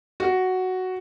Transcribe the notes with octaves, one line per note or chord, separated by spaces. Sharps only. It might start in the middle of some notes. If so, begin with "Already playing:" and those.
F#4